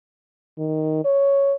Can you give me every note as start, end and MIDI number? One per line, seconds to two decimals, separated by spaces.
0.58 1.04 51
1.05 1.55 73